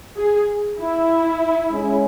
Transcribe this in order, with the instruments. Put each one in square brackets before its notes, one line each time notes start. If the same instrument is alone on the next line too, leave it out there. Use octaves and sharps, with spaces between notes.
[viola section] G#4
E4
[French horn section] G#3 C#4 G#4